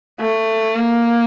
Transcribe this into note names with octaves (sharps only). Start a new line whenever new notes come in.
A3
A#3